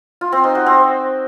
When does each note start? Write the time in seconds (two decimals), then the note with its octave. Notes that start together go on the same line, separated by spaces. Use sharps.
0.21 F4
0.32 C4
0.44 D#4
0.55 F#4
0.66 C4